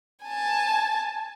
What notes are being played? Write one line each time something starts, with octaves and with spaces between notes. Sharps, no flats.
G#5 A5